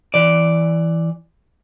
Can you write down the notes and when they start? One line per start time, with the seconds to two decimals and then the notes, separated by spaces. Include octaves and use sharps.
0.14 E3 D5